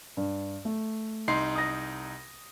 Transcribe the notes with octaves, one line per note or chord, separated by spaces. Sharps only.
G2
A3
C2 D#4 C6 C7
D#6 A#6